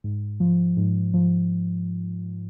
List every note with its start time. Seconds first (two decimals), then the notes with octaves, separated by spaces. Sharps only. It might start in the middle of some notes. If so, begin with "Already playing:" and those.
0.04 G#2
0.40 F3
0.77 G#2
1.14 F3